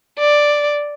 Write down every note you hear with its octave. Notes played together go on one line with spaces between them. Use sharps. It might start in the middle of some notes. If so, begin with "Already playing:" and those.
D5